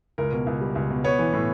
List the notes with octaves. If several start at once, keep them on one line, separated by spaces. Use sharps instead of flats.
C#2 A#4
B2
C#2
G3
C#2
B2
B3 C#5
E3
A2